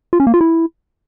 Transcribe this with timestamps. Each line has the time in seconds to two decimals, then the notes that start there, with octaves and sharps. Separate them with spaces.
0.13 F4
0.20 C#4
0.27 A#3
0.34 F4
0.41 E4